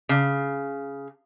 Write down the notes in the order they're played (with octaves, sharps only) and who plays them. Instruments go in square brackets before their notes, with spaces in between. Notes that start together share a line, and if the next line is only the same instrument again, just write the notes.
[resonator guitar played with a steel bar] C#3